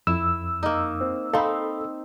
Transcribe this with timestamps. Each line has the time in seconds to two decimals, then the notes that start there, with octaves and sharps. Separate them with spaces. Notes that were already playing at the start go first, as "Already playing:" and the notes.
0.07 F2 E4 E6
0.63 A#3 D#4
1.01 C4
1.33 C4 D#4 A4 F5 B5